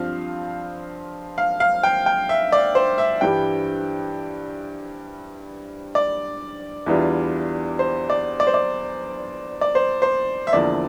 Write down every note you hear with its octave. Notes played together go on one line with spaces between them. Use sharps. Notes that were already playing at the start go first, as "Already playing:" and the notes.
Already playing: G2 F3 C4 F5
F5
F5
G5
G5
E5
D5
C5
E5
G2 E3 G3 G5
D5
E2 E3 G3 D4 F4
C5
D5
D5
C5
D5
D5
C5
C5
E5
E2 D3 F3 A#3 E4 D5